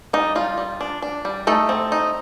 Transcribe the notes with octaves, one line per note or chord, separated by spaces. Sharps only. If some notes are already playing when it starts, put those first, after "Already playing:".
G3 D#4
G3 F4
G3
D4
D4
G3
A3 D#4 A4
C4
D#4